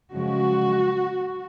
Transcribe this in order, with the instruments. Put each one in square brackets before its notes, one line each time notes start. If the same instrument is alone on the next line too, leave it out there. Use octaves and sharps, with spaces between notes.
[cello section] F#2 C#3 F3 G#3 F#4